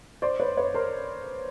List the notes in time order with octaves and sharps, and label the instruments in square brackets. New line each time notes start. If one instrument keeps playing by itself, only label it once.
[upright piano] C5 D5
B4 C#5
B4 C#5
A#4 C5